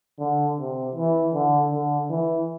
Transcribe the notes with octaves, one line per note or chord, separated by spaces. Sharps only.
D3
C3
E3
D3
D3
E3